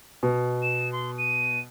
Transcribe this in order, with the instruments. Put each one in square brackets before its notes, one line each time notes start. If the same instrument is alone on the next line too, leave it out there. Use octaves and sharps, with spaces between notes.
[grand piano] B2
[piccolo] E7
C6
D#7